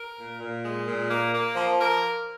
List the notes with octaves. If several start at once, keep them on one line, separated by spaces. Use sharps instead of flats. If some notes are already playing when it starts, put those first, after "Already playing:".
Already playing: A#4
A#2
A#2
G#3
A#2
A#3
A#3
F3
A#4